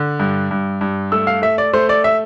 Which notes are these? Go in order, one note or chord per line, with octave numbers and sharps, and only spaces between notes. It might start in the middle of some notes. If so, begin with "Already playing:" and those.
Already playing: D3
G2
G2
G2
A3 E6
F5
A3 E5
D5
A3 C5
D5
E5